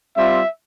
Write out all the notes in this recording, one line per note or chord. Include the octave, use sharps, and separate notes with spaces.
G3 C4 F4 E5